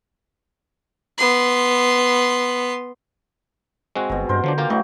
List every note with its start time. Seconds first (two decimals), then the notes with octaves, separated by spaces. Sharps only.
1.18 B3 C6
3.96 G#3 C4 F#4
4.10 G1 B2 A#5
4.29 G2 A#4 C5
4.44 D3 F3 F#3 D4
4.58 A#3 F4 G4 A#4
4.70 C#3 E3 F#3 G3 A3 D#5